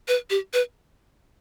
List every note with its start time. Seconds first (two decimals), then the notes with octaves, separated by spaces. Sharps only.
0.08 B4
0.30 G4
0.53 B4